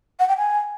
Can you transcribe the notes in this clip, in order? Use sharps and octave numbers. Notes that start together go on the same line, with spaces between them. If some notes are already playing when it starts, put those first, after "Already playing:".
F#5
G5
G#5